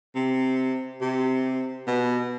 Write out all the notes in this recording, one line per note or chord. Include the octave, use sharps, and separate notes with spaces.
C3
C3
B2